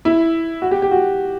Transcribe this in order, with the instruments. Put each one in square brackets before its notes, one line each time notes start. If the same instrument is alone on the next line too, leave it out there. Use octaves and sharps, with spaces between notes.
[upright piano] E4
F#4
G4
G4
F#4